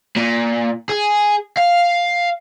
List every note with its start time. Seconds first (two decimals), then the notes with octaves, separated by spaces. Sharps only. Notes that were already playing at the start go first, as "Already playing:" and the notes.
0.16 A#2
0.89 G#4
1.57 F5